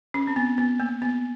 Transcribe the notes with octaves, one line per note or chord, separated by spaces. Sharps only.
C#4
C4
B3
B3
A#3
B3